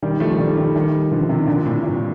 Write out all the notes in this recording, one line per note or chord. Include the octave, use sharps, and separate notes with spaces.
D#3 G3
F3 A3
D#3 G3
D#3 G3
D#3 G3
D3 F3
C3 D#3
A#2 D3
A2 C3
G2 A#2